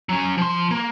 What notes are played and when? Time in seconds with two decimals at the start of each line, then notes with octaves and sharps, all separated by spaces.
0.09 F#3 C#4
0.38 F3 C6
0.71 A#3